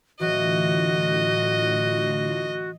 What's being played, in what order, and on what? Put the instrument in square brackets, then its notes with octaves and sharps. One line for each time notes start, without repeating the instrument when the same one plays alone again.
[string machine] A2 D3 F4 [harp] E3 F#3 [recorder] F#4 [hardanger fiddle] D#5